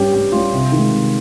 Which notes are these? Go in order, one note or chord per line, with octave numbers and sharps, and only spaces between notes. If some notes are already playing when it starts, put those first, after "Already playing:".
Already playing: G2 G3 C#4 G4 C#5
G2 G4
G3 C#4 F4
C3
D#3 G#3
C3